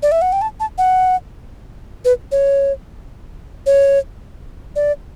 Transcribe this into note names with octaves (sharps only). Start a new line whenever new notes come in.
D5
E5
F#5
G5
A5
A5
F#5
B4
C#5
C#5
D5